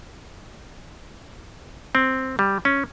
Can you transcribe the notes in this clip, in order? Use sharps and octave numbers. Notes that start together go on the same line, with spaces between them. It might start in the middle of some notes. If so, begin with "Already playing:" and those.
C4
G3
C#4